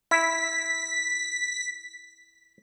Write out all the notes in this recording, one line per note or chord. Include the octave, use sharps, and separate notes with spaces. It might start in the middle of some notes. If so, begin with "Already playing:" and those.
E4 B6